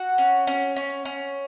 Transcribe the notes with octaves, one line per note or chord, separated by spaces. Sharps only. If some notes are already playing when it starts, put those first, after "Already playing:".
Already playing: F#4 F#5
C#4
C#4
C#4
C#4